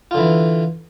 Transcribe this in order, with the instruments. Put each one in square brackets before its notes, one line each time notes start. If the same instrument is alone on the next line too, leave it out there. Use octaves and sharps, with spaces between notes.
[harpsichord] F4
D3
E3